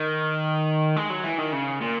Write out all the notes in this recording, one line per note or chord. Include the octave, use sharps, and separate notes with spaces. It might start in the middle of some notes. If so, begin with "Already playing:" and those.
Already playing: D#3
G#3
F#3
E3
D#3
C#3
A#2